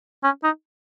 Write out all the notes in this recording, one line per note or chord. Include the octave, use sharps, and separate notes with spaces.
C#4
D#4